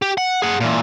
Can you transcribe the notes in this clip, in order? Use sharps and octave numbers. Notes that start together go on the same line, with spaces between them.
G4
F#5
G#4 F#5
A#2 E3